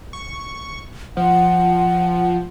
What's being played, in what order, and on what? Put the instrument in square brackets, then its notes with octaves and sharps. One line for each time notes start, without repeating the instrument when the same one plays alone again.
[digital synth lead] C#6
[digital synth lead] F3 [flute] F#5